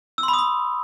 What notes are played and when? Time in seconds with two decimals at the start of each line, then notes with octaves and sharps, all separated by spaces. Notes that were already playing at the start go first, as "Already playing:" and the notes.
0.18 E6
0.23 C6
0.28 B5
0.33 D#6
0.39 B5